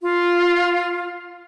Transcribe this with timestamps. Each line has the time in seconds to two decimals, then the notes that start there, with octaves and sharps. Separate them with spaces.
0.01 F4